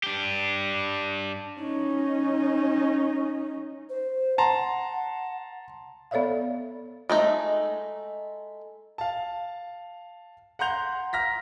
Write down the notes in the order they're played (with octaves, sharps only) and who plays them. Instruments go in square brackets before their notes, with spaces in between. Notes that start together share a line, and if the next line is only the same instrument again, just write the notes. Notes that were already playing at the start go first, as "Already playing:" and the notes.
[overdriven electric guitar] D4 G4
[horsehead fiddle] C#4 D#4
[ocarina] C5
[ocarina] F#5 [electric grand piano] A5 A#5 C6
[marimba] B3 A4 C#5 D5 E5 F5
[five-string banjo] G#3 A3 D#4
[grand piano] F5 A5
F#5 A#5 C6 G6 F7
A#5 F6 A#6 B6